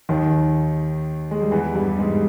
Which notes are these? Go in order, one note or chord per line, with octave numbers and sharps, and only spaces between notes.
D#2 D#3
G#3
G3
E2 E3
G2 G3
G#2 G#3